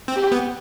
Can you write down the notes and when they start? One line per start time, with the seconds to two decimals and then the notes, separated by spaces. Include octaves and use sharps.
0.08 C4
0.16 G4
0.32 B3